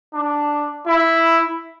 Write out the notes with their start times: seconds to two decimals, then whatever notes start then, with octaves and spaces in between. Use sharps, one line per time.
0.14 D4
0.87 E4